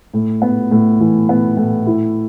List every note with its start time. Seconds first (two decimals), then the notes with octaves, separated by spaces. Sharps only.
0.14 A2
0.42 B3
0.71 A2
1.00 E3
1.29 B3
1.57 A2
1.86 E4